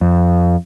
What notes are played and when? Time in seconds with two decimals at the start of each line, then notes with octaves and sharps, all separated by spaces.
0.01 F2